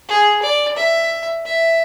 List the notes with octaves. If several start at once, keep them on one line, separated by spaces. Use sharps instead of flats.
G#4
D5
E5
E5